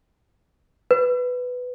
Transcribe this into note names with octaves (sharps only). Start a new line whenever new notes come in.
B4